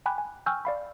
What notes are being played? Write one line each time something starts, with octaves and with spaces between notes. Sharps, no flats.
G5 G#5 B5 D6 F#6
G#5
G5 G#5 C#6 E6 F6 G6
D5 F5 B5